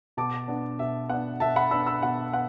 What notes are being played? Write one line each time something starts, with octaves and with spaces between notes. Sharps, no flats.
B2 A5 D6
B3 D4
B2 E5
B3 D4 F#5
B2 E5 A5
F#5 B5
B3 D4 B5 E6
B5 E6
B2 F#5
B3 F#5